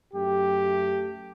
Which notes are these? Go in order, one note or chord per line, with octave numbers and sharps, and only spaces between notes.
F#2 A3 G4